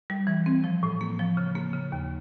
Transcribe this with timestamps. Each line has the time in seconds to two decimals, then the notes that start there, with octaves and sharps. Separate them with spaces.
0.10 G3
0.27 E3
0.46 C4
0.64 F3
0.83 A2
1.01 A#3
1.19 F3
1.37 C#3
1.55 A#3
1.73 C#3
1.92 D#2